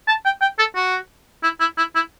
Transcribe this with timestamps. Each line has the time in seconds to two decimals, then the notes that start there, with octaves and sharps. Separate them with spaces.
0.08 A5
0.25 G5
0.42 G5
0.59 A4
0.76 F#4
1.44 E4
1.60 E4
1.78 E4
1.95 E4